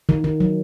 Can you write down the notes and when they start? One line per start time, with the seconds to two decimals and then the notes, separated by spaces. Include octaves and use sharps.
0.09 D#3
0.24 D#3
0.40 F#3